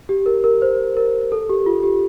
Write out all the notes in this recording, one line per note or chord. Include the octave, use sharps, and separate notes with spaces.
G4
A#4
A#4
C5
A#4
A4
G4
F4
G4